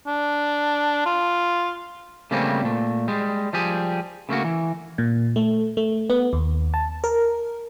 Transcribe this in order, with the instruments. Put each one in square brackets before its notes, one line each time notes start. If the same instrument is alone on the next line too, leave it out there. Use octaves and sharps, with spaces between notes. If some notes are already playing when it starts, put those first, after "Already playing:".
[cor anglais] D4
F4
[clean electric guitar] C#3 G3 A3 A#3 C4 C#4
A#2 A3
G3 G#3
F3 G3 G4 G#4
C#3 A3 A#3 F#4
E3
[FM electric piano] A#2
A3
A3
B3
D#2
A5
A#4